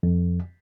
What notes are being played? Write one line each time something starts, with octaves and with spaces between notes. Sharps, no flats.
F2